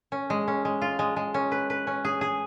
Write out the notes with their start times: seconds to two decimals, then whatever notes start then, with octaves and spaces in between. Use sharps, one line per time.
0.12 C#4
0.30 G#3
0.48 C#4
0.65 G#3
0.82 F4
0.99 G#3
1.16 G#3
1.34 C#4
1.52 B4
1.70 B4
1.87 C#4
2.05 G#4
2.21 G#4